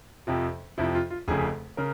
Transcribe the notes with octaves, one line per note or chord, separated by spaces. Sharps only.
F2 C3 F3
F2 C3 F3 E4
F4
F4
F1 F2 C#3 G#4
C#3 A#4